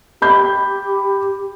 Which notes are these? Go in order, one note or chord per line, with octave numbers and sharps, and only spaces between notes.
G4 B5 G6